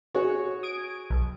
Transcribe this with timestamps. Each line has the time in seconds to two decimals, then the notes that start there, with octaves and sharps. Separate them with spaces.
0.14 F#4 G#4 C#5
0.63 D#6 G#6 D7
1.10 B1